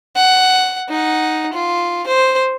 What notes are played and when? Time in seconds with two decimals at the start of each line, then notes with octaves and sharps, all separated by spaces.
0.16 F#5
0.89 D#4 F#5
1.53 F4
2.07 C5